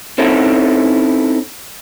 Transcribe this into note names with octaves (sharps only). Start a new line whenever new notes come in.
C4 C#4 D#4 E4 A4